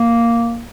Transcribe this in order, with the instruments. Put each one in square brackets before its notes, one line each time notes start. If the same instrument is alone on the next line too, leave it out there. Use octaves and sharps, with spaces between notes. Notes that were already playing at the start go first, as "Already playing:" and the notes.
Already playing: [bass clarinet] A#3